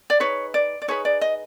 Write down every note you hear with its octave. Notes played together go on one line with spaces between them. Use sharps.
D5
D#4 G#4 B4 C#5
D5
D5
D#4 G#4 B4 C#5
D5
D#5